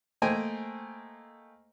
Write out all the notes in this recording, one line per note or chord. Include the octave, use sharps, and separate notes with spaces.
A3 A#3 C5 D#5 G5 G#5